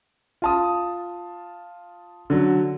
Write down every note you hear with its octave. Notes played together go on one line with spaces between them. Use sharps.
F4 A5 D#6
D3 F#3